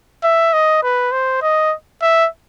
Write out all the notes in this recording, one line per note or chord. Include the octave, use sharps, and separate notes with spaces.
E5
D#5
B4
C5
D#5
E5